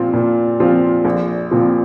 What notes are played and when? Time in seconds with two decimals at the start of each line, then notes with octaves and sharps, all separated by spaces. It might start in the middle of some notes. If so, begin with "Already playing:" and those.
Already playing: A#2 F3 C4 F4
0.13 A#2
0.60 F3 C4 F4
1.05 A#1
1.51 A#2 F3 C4